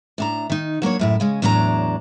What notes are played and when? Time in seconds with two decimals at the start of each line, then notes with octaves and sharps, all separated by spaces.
0.18 A2 D4 A#5
0.50 D#3 D#4
0.82 F#3 A#3 D4 C#5
0.99 F#2 A2 E4
1.20 C#3 G#3 C#4
1.42 E2 A2 F#3 D4 G#4 A#5